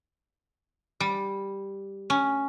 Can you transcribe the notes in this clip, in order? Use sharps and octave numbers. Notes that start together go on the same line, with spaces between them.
G3
C#4